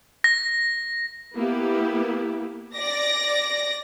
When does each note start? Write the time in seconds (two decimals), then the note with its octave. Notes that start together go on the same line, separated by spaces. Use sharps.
0.24 A#6
1.34 A#3 B3 E4 G4
2.76 D5 A#6